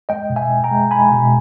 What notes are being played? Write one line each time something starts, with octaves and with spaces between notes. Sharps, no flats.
G#3 D#5 G5
B2
E5 G#5
B2
G5 A#5
G#3
G#3 G#5 B5
B2